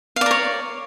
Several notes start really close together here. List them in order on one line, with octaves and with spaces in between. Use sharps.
F5 D5 A#4 C#5